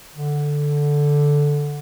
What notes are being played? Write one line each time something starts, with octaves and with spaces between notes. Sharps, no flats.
D3